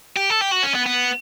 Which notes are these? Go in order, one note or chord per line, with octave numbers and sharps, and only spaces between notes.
G4
A4
G4
F#4
C#4
B3
B3